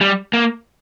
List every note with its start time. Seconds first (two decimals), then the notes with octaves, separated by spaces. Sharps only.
0.01 G3
0.33 A#3